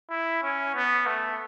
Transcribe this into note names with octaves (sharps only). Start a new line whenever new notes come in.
E4
C#4
B3
A3